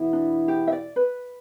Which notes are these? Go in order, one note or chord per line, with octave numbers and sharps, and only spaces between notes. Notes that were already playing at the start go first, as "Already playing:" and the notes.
Already playing: E2 B2 B3 E4
D4
G4
E5
D5
B4